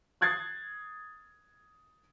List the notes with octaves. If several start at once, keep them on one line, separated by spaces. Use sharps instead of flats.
D#6 F#6 G#6 A6 C7